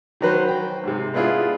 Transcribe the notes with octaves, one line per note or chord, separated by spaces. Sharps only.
D#3 F#3 B4 C5
G5
G#2 C3
G#3 B3 D4 E4 F4 G#4